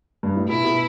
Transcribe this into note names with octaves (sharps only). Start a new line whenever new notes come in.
G2
A2
B2 E4
B2